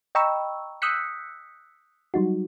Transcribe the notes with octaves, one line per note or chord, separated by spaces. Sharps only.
D#5 G5 A#5 B5 C#6 E6
D#6 E6 F#6 G6 B6 C#7
F#3 G3 D#4 F#4